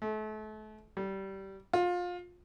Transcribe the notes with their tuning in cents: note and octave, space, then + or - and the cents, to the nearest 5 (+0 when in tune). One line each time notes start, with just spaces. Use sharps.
A3 -35
G3 -20
F4 +25